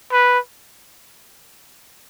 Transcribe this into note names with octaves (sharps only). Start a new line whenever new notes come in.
B4